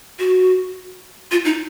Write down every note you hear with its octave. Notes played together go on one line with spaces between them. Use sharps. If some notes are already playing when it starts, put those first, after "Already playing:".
F#4
F4
D#4